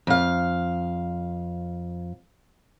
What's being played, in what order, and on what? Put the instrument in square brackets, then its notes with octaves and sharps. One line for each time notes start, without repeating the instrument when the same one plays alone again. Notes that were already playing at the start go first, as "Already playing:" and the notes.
[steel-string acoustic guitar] F2 F5